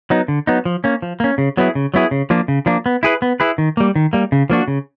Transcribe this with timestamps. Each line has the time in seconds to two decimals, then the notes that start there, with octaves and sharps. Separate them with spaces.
0.10 F#3 B3 D#4
0.28 D3
0.47 F#3 B3 D#4
0.65 F3
0.84 A#3 C#4
1.02 F3
1.20 A#3 C#4
1.38 C#3
1.57 F#3 B3 E4 G#4
1.75 C#3
1.94 F#3 B3 E4 G#4
2.11 C#3
2.30 F3 A#3 D4
2.48 C#3
2.66 F3 A#3 D4
2.86 B3
3.03 E4 G#4 B4
3.22 B3
3.40 E4 G#4 B4
3.58 D#3
3.77 G3 A#3
3.96 D#3
4.13 G3 A#3
4.32 C#3
4.50 F3 A#3 D4 F#4
4.68 C#3